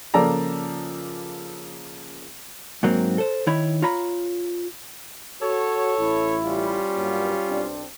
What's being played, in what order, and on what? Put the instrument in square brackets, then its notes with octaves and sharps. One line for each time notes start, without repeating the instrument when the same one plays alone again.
[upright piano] C#3 F3 A#3 A4 D5 A#5
[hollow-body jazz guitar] G#2 F#3 A#3 C4
A4 C5
D#3 E4 C#5 B5
F4 C#5 A#5 B5
[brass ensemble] F#4 [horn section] A4 C#5
[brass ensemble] A1 E4
[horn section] G3 C#4 F4
[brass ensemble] G2 F#3 A#3
B1 C4 D4